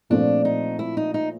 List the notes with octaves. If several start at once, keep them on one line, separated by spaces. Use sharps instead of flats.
A#2 F3 A3 C4 D4 F4
D#4
E4
D#4
D#4